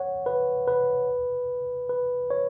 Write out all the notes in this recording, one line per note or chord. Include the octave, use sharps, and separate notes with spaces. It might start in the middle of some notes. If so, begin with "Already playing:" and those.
Already playing: C#5 F#5
B4
B4
B4
C#5